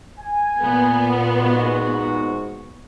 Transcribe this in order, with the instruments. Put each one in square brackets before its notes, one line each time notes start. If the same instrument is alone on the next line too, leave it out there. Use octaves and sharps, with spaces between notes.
[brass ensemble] G#5
[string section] A#2 B3
[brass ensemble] G#2 F#4